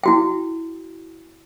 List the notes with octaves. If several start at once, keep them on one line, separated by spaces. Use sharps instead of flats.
E4 F#4 G5